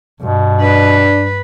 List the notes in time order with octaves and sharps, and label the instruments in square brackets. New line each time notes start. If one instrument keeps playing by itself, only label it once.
[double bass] G2 [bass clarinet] B2
[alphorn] D4 [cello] B4